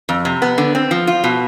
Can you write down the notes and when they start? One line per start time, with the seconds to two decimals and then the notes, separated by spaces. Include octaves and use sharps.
0.09 F2
0.25 C3
0.42 B3
0.58 D3
0.75 C4
0.91 F3
1.07 F4
1.24 B2